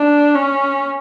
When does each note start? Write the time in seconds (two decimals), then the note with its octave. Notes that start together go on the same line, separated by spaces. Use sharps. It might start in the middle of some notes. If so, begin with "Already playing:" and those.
Already playing: D4
0.35 C#4